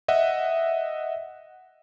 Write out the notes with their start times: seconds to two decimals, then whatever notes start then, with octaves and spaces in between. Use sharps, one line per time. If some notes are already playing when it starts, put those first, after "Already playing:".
0.08 D#5 E5 F#5